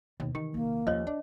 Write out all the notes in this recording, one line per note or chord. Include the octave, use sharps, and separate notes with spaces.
D#2 B2
D#3 E3 G4
A#1 C3 A#3
D#2 F3 C#4 C#5 D#5
E3 D4